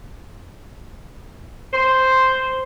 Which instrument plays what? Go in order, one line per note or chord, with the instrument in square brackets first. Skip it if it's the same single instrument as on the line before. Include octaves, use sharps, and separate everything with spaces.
[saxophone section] C5